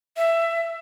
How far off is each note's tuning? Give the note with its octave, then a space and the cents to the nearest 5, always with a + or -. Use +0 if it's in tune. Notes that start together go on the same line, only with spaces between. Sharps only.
E5 +15